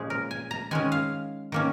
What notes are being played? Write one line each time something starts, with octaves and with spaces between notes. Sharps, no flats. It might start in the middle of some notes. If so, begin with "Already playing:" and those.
Already playing: A#2 F3 G#3 C#4 G#4
A#4
G#5
A#5
D#3 G#3 C#4 G#5
F5
D#3 A#3 C#4